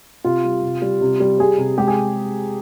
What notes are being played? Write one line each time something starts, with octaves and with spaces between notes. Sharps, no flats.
C3 F4
G3
C3
G3
C3
G3
G3 G#4
C3
G#3 G4
G#4